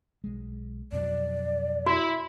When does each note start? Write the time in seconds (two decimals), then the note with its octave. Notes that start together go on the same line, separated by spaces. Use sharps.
0.24 B1 G#3
0.92 F2 B2 F#3 D5
1.86 E4 F#4